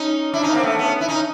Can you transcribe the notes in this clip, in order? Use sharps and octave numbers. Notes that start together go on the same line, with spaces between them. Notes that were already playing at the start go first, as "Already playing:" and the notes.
Already playing: C#4 D#4
D4 E4
C#4 D#4
A#3 C4
A3 B3
B3 C#4
E4
C#4 D#4